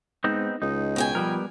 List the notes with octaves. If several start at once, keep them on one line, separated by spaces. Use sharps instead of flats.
G#2 B3 C4 D#4
C#2 D#4
B2 G5 G#5
F3 G3 B3 A#4